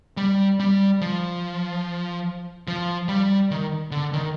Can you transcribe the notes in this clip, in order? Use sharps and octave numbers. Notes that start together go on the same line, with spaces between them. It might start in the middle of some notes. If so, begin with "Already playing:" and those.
G3
G3
F3
F3
G3
D#3
D3
D#3